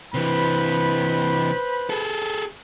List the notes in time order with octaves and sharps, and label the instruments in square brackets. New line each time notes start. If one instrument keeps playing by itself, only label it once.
[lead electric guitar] C3 E3 [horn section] B4 C5 B5
[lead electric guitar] G#4 A4